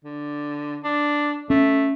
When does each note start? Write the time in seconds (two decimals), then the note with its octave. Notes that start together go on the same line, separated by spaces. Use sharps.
0.04 D3
0.84 D4
1.50 A3 C#4